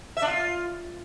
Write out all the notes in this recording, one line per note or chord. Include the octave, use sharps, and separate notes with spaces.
E5
D4
F4